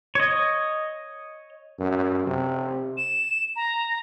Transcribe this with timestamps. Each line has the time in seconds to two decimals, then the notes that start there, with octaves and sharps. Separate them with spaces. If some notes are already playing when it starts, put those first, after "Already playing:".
0.15 C#5 D#5
1.79 F#2
2.27 C3
2.97 E7
3.56 A#5